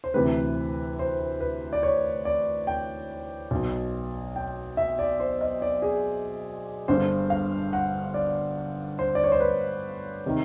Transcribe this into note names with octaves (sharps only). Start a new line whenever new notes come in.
C5
D2 C3 E3 B4
C5
B4
D5
C#5
D5
G5
B1 B2
G5
E5
D5
C5
D#5
D5
G#4
G1 G2 D3 C5
F5
F#5
D5
C5
D5
C#5
C5
B4
C3 D#3